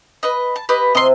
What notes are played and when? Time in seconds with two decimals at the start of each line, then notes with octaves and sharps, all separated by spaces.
0.23 B4 D#5
0.56 A5
0.69 G4 B4 D#5
0.95 C3 D#5 E5 C6